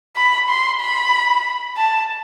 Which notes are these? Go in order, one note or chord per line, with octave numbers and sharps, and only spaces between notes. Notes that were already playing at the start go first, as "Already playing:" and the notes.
B5
C6
B5
A5